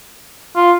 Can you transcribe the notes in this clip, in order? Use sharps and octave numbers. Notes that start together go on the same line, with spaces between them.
F4